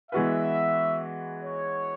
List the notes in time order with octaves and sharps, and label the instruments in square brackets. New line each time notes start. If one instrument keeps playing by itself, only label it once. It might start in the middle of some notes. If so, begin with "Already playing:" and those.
[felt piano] E3 G#3 B3 F#4 B4 [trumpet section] E5
[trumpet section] C#5